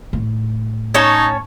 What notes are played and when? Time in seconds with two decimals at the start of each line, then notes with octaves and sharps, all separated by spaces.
0.13 A2
0.94 C#4 D#4 C#5 A5